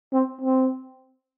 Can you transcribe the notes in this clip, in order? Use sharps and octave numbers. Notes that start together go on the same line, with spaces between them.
C4
C4